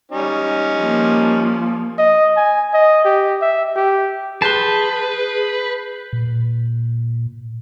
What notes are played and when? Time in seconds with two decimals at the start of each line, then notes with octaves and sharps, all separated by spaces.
0.12 G3 C#4 D#4
0.79 F3 A#3
1.98 D#5
2.37 G#5
2.74 D#5
3.05 G4
3.41 E5
3.76 G4
4.42 G#4 B4 A5 C6 F#6 G6 C7
6.13 A#2